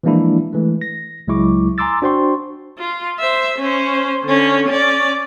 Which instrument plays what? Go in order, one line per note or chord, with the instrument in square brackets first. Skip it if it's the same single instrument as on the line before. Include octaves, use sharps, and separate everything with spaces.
[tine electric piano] E3 F3 G#3 A#3 D4 E4
E3 G#3 A3
A#6
C#2 F#3 G#3 E4 C#6 D6
G#5 A#5 C6 D6 E6 A6
D4 F#4 C5 G5 C6 C#6
[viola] F4
C5 E5
C#4 C5
D3 C#4
C#4 D5